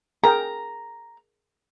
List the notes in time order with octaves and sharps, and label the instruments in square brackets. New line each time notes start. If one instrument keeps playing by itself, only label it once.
[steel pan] G#4 A#4 G5 [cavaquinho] A#5